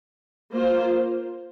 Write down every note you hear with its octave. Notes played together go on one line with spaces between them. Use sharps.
A#3 F4 C5